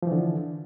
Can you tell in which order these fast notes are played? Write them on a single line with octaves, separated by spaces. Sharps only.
F3 E3 D3